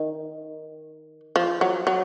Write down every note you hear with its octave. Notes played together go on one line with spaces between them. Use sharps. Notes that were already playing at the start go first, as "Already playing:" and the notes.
Already playing: D#3
F3
F#3
F#3